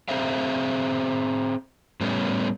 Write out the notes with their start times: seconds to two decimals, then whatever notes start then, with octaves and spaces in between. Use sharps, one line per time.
0.08 C4 G#4 C5 E5 F5
2.01 A2 G3 B3 C#4